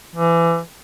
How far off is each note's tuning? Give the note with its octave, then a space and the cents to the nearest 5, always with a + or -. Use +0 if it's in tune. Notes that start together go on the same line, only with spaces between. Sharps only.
E3 +30